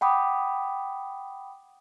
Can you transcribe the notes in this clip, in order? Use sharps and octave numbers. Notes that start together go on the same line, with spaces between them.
F#5 G5 B5 D6 D#6